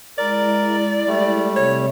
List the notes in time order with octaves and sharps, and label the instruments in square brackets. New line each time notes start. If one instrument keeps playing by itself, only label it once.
[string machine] G#3 E4 [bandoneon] A#4 [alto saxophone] D5
[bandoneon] G3 A3
[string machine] C3 [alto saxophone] C#5